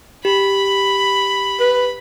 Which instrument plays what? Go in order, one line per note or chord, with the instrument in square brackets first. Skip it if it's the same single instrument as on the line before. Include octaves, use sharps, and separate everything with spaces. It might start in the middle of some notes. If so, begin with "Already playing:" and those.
[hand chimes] G4 [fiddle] B5
[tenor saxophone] B4